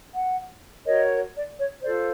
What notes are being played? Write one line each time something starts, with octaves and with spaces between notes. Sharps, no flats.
F#5
F#4 A#4 C#5 D#5
D5
C#5
F4 A4 C5 D5